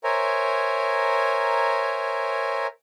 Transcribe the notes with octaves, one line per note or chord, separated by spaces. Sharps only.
A#4 C5 C#5 E5 G#5 A#5